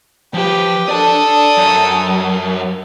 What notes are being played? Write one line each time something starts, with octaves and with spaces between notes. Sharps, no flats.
F3 G4 B4
A4 D5 A5 D#6
F#2